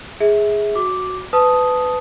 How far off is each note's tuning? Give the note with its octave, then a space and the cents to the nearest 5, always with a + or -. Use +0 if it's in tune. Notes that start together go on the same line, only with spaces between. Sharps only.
G#4 +0 E5 -25
F#4 +0 D6 -5
B4 +25 A5 -10 D#6 +0